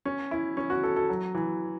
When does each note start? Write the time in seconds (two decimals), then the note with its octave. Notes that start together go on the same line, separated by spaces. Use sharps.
0.05 C#4
0.31 E4
0.57 C#4
0.70 F#4
0.83 A4
0.96 A4
1.09 F#3
1.35 E3